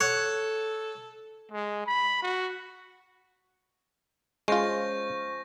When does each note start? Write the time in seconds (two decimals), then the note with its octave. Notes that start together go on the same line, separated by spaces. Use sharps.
0.01 A4 C#5 F#5
1.51 G#3
1.87 B5
2.22 F#4
4.48 F3 G#3 C#4 F4 C#6 G6 A#6